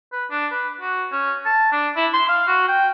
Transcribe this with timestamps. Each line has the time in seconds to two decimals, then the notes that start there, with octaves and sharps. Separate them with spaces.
0.12 B4
0.31 D4
0.51 B4
0.81 F#4
1.12 C#4
1.46 A5
1.72 D4
1.96 E4
2.13 C6
2.29 F5
2.48 F#4
2.68 G5